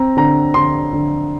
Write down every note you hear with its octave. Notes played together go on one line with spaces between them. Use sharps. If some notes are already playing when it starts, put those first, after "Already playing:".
Already playing: C4 A#5
D3 A#5
D3 C6
D3